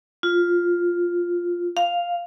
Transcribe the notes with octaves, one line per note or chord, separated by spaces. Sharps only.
F4
F5